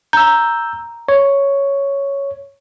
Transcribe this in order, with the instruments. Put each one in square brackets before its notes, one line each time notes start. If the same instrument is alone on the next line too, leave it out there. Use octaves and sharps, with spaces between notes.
[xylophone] A#5 [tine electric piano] E6 G6
[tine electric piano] C#5